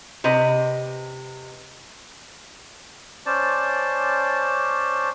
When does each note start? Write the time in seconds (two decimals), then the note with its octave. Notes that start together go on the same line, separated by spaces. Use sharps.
0.24 C3 B4 D#5
3.26 C#4 C5 D5 A5